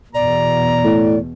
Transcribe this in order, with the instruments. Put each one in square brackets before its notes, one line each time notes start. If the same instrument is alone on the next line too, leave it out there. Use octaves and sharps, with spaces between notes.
[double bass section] E2 B2 [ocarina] D5 [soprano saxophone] A#5
[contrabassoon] A2